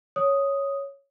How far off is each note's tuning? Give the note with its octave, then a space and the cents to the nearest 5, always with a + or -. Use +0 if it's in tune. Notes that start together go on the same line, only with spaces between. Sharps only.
C#5 +0 D#6 +0